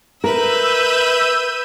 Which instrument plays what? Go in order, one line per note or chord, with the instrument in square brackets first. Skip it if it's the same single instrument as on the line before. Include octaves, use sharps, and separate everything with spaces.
[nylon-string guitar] A#4 [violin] B4 E5 [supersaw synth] E6 G6 D#7